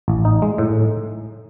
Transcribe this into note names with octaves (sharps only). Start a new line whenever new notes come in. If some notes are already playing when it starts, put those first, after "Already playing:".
A1
D#4
G#3
A2